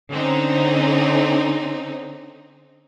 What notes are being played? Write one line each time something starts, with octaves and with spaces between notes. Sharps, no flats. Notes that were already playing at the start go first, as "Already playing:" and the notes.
D3 C4 C#4 D#4